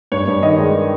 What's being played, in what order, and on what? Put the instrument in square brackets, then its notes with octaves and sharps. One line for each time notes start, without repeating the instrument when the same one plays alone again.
[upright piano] G2 C#5
G2
D#3 D#5
G#3